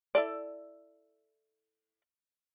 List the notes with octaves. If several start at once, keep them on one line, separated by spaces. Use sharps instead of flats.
E4 A4 D5